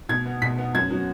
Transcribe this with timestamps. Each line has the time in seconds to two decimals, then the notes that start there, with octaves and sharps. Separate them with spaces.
0.09 B2 G#6
0.26 B3
0.42 B2 B6
0.58 B3
0.74 F#2 G#6
0.90 F#3 B3